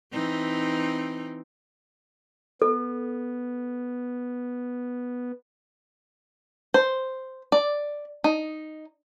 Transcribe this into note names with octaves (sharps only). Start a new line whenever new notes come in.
E3 C4 D#4
B3 A4
C5
D5
D#4